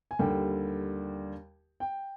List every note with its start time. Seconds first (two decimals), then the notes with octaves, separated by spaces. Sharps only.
0.11 G#5
0.19 D#2 D3 G3 G5
1.80 G5